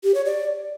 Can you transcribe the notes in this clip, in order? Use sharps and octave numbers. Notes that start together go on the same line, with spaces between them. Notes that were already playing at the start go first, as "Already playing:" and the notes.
G4
C#5
D5